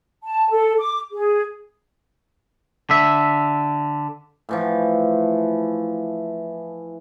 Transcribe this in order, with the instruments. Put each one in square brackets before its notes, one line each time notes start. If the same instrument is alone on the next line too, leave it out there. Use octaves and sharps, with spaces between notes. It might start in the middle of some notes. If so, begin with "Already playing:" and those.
[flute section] A5
A4
D6
G#4
[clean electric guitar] D3 E5
[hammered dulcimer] A2 E3 F3